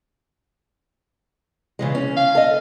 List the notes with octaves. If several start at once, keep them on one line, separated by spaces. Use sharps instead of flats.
C#3 E3 G#3
C#4
F5
A4 D#5